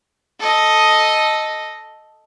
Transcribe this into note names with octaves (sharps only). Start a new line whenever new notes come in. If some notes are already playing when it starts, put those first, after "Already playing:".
A4 D#5